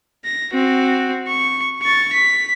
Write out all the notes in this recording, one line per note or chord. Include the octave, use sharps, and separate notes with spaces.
A#6
C4 F#4
C#6
C#6 A6
B6